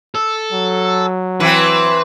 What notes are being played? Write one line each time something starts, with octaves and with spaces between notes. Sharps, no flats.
A4
F#3
E3 C4 B4